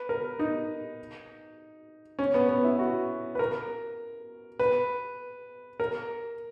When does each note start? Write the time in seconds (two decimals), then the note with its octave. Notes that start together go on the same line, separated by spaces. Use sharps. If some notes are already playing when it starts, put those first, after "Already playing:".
Already playing: B4
0.09 A#4
0.39 D#4
2.19 C#4
2.34 B3
2.49 B3
2.64 E4
2.79 F#4
3.35 B4
3.39 A#4
4.59 B4
5.80 A#4